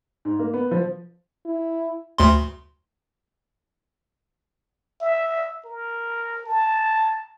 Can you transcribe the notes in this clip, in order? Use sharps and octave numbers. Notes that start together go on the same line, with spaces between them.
G#2
A#3
B3
F3
E4
D2 C6
E5
A#4
A5